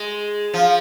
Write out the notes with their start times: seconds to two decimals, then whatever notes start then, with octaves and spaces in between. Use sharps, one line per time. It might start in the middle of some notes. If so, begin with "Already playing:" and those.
Already playing: G#3
0.54 F3